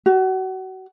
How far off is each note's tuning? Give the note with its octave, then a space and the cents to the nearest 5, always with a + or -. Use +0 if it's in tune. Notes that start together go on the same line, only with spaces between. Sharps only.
F#4 +30